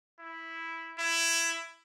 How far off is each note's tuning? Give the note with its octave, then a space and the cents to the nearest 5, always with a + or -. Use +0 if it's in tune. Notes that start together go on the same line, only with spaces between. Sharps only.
E4 -5
E4 +15